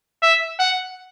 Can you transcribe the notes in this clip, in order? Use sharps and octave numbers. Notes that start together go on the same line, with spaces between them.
E5
F#5